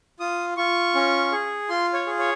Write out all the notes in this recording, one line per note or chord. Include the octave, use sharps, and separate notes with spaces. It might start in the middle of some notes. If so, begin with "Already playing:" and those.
F4 D#6
F4 C#6
C#4
G#4
F4 C6
C#5
G#4
C#5